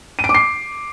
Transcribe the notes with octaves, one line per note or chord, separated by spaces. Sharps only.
D#7
D7
D6
C7